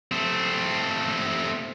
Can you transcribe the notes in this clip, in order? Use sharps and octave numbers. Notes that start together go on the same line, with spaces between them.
A3 C4